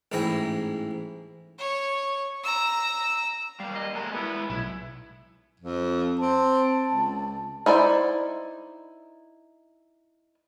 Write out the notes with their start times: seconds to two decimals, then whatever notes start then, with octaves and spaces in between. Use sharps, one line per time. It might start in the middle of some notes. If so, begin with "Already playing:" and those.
0.12 A1 G#2 E4 G#4 G5 A#5
1.59 C#5
2.43 A#5 E6
3.60 G3 A#3 F5
3.75 D#5
3.95 G3 G#3 A4 A#4
4.11 G#3 B3 E4
4.50 B1 E4
5.60 F2
6.19 C4 A5
6.87 C#2
7.66 D#4 E4 C5 D5